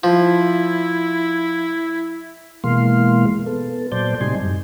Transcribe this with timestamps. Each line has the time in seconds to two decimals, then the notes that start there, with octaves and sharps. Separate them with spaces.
0.04 F3 E4
2.64 B2 E3 G#3 A#3 F5 C6
3.46 B3 A4
3.92 A#2 F#3 C5 D5 A5 G6
4.21 A2 C3 G3 D#4 G#5 C6
4.40 F#2